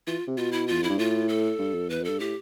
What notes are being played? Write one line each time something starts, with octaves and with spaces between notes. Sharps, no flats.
E3 F4
C3
B2 F4
E4
E2 F4
F2 E4
G2
A2 F4
A4
G2
F2
E2 B4
F2
G2 A4
A2 G4